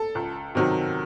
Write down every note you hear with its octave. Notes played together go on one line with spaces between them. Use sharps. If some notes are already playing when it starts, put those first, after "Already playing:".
Already playing: A4
C#2
C3 D#3 F#3